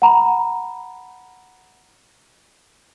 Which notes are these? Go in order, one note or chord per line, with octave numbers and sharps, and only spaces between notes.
F#5 A#5 B5